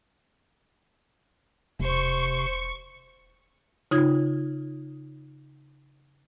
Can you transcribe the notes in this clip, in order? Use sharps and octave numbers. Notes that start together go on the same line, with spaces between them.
E1 C3 C5 C#6
C#3 D#4 F4 G#6